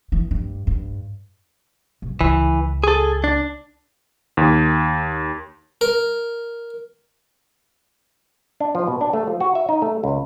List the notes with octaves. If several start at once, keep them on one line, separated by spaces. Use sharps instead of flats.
E3
G2
G2
B1
C#2 E3
G#4 A4
D4
D#2
A#4
D4
F3
B2
D4
A3
F3
F#4
E5
D#4
A3
C#2